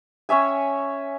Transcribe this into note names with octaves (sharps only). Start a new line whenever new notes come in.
C#4 C#5 E5 G#5